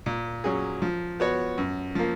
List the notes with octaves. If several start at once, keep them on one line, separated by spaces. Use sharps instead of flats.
A#2
F#3 C#4 G#4
F3
B3 F#4 C#5
F#2
F3 A#3